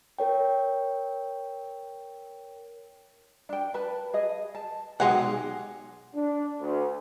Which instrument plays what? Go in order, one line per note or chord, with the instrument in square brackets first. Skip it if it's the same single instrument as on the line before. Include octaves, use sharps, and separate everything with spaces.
[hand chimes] A#4 C#5 G5
[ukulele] D4 G5
B4 A5
G#4 D#5
A5
[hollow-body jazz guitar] B1 G#3 F#5 [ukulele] F#4 G4 G#5
[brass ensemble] D4
D2